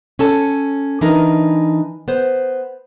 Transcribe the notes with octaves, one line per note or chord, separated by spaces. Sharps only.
C#4 A4 A5
E3 D4 D#4 A#4
B3 C5